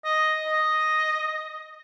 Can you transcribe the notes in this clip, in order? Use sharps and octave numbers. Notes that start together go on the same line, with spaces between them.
D#5
D#5